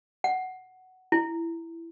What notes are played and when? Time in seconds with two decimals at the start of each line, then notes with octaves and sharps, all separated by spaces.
0.24 F#5
1.12 E4